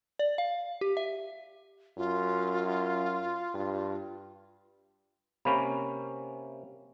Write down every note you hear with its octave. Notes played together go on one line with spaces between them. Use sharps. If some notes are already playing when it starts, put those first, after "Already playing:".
D5
F5
G4
E5
F#2 F4
G2
C3 A#3 C#4 B5